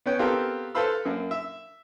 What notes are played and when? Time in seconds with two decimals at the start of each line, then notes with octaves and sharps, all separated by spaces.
0.06 B3 C#4 G5
0.19 B3 C4 F4 G4 A4 A#4
0.75 A4 B4 C5 F5 B5 E6
1.05 F#2 A#3
1.31 E5